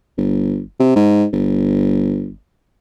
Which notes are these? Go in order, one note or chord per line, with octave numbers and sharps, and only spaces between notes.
G1
C3
G#2
G1